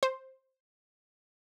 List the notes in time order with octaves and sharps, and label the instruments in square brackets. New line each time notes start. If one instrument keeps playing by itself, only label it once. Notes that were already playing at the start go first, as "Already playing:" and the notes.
[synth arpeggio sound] C5